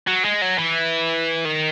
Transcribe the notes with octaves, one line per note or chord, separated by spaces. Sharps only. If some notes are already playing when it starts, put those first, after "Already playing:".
F#3
G#3
F#3
E3
D#3